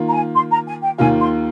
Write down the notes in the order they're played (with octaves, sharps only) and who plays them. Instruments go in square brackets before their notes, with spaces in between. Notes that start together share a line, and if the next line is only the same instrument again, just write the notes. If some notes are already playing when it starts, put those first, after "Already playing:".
Already playing: [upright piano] D#3 A#3 F4
[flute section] A#5
G#5
C6
A#5
G#5
G5
[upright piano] D#2 D#3 A#3 F4 [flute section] G#5
[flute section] C6